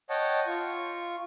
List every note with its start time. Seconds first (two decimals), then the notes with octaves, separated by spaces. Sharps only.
0.10 C#5 D#5 F#5 G5 A5
0.47 F4 C#6